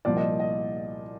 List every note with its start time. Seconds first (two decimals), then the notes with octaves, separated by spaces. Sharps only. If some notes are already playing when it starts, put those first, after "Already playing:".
0.05 C2 A#2 F3 D5
0.17 D#5
0.40 D#5